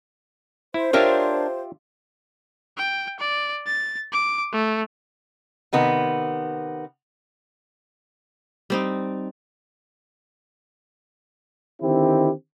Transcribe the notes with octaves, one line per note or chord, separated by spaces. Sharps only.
E4 C5
D4 F4 G4 A#4 C#5 E5
G5
D5
A6
D6
A3
C3 D#3 B3
G3 C4 D#4
D3 D#3 C4 E4 G4